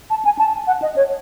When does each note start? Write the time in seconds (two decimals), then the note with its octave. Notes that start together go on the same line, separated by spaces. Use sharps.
0.10 A5
0.25 G#5
0.39 A5
0.67 F#5
0.82 D#5
0.96 C#5